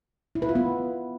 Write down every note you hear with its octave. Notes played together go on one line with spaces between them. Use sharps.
E4
B4
F4
B3